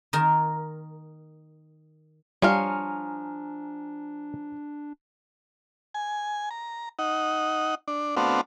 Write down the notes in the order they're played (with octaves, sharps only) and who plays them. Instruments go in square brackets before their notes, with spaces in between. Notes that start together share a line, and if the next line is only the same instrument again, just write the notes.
[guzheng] D#3 A#4
[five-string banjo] F3 C#5 F5 [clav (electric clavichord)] G3 [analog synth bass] D4 [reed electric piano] G#5 A#5 F6
[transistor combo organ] G#5
A#5
D#4 F#5
D4
A3 B3 C4 D4 F#4 F5